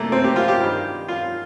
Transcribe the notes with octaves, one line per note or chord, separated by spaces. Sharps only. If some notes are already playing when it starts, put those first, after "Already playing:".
Already playing: C2 A#2 A3 A#3
C4
G4
F4
G4
G2 D#3
F4